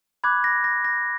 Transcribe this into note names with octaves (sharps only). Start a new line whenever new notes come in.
B5 D6 F#6 G#6
A#6
A#6
A#6